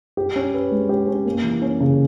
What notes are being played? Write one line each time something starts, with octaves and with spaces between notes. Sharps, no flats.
G4
C#4
B4
G#3
G4
C#4
A#3
E3
C#4
C#3